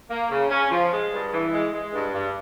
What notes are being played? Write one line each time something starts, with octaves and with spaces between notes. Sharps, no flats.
A#3
C#3
C#4
F3
G#3
G2
E3
G#3
G#3
G2
G2